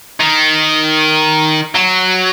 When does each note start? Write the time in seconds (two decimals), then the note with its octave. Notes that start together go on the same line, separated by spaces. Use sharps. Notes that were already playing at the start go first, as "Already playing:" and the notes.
0.20 D#3
1.75 F#3